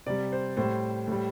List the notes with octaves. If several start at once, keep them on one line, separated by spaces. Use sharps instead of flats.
C3 G3 D5
C5
A2 G3 C5
A2 G3